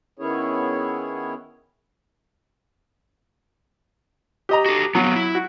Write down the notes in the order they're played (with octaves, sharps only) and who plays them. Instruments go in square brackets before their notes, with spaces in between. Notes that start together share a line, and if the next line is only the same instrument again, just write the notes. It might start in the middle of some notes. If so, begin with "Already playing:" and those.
[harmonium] D#3 B3 C#4 E4 G#4 C#5
[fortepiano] G4 D#5 A#5
[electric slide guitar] F#4 A4
[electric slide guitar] D3 A#3 B3 [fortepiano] F#3
[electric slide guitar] E4
[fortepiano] F#4